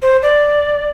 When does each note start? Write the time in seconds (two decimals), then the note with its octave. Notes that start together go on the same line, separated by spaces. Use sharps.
0.02 C5
0.22 D5